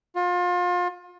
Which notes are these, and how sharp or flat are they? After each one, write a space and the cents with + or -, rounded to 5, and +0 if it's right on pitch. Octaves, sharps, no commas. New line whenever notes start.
F4 +30